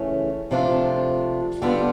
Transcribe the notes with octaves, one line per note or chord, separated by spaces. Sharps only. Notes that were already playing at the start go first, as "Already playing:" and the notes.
Already playing: C#3 E3 A3 C#4
C3 F3 A3 D4 F4
D3 G3 B3 D4 F4